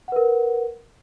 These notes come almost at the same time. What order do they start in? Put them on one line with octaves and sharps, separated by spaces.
F#5 B4 A#4